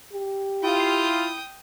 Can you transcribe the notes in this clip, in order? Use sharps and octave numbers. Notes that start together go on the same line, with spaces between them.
G4
E4 F4 G5 D#6